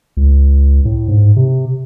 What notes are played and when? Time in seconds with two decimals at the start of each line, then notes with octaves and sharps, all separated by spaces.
0.17 C#2
0.85 A2
1.08 G#2
1.36 C3